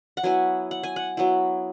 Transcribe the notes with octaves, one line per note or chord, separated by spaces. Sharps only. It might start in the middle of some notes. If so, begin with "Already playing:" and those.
F#5
F#3 B3 E4 G#5
F#5
G#5
F#5
F#3 B3 E4